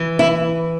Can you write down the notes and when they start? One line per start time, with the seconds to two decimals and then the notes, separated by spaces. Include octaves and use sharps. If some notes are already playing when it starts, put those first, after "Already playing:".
Already playing: E3
0.19 E4